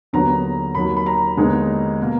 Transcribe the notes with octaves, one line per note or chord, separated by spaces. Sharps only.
D#2 D3 F#3 B3 A#5
D#2 D#3 F#3 B5
B5
A#5
D#2 D3 G#3 B3 D#4
B2 A#3